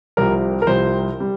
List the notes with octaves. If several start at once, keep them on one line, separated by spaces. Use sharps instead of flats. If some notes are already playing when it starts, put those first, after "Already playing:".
C2 C3 F3 A#4
A#4
C2 C3 F3 C5
G3